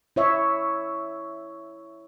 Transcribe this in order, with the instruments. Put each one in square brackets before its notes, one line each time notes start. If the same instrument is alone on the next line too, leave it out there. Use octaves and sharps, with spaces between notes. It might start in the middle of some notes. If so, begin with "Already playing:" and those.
[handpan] E4 C#5 E5